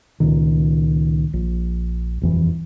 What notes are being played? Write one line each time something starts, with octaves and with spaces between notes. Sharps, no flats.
C#2 A#2 D#3
A#1
D#1 F2 E3